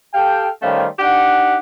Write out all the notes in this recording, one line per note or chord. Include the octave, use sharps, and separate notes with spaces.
G4 A4 F5 G5
D#3 G3 A3 C#4 C5 F5
D4 D#4 G4 F#5